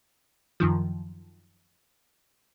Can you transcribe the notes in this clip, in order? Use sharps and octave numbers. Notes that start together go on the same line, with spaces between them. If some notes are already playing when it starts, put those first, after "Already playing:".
F#2 D#3 F3